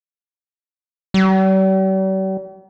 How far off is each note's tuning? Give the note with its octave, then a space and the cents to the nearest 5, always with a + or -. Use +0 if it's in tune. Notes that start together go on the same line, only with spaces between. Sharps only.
G3 -45